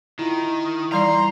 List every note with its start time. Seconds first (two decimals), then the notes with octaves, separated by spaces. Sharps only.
0.19 D#3 E4 F4
0.92 E3 G3 D5 A#5 C6